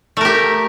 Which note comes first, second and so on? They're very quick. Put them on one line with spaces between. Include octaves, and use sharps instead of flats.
A3 A#4 G4